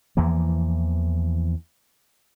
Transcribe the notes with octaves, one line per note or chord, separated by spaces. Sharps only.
E2 E3 F3 A#3